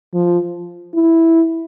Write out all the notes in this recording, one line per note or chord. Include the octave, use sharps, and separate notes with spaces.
F3
E4